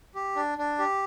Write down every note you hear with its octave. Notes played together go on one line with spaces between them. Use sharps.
G4
D4
D4
G4